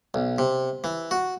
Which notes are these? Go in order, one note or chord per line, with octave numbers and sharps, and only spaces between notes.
B1
C3
E3
F#4